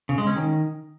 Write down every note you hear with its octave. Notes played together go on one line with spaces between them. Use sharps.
C#3
G#3
C#4
D#3